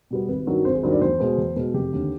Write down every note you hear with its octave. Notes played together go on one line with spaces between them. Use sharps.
B2 G3 B3
G#1 B4
G2 D#3 F#3
G#1 C5
G#4
G2 D#3 F#3 C5
D5
E2 C5
B2 G#3 B3
E2
B2 G#3 B3
F1 G4
D#2 D3